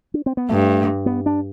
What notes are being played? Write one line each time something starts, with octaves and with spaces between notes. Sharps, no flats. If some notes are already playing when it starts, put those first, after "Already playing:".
D4
C4
B3
G2 A3
B3
D4